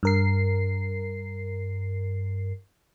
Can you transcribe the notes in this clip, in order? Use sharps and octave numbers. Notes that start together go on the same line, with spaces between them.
G2 A#4 C7